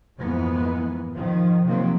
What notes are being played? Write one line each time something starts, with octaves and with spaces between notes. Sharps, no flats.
F2 G#2 E3 G#3 A#3 B3
D#3 F3
C3 D#3 F3 F#3 A#3 C4